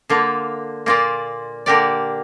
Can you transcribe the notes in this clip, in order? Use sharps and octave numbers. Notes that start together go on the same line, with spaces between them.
D3 A#3 F4
A#2 A#3 F4 D5
D3 A#3 G4 A#4 D5